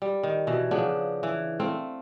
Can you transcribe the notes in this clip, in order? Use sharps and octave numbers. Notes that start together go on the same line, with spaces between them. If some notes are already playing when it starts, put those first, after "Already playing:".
G3
D#3
B2 E3
C#3 F3 B3 D4
E3
A3 C4 F5